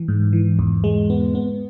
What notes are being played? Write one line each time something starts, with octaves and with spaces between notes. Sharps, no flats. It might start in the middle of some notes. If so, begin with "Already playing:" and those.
Already playing: E3
G#2
E3
E2
G#3
B3
B3